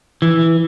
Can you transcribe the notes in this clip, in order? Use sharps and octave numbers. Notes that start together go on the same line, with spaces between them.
E3